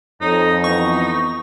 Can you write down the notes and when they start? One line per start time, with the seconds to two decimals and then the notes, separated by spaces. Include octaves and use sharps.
0.21 F2 C4 D#4 A4 C#5
0.64 E3 B3 D#4 C#6